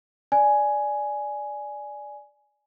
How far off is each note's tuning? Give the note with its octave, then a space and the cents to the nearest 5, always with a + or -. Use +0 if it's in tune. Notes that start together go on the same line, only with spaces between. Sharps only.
D5 +0 G#5 +5